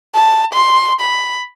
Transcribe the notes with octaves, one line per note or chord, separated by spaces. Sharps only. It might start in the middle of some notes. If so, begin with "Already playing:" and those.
A5
C6
B5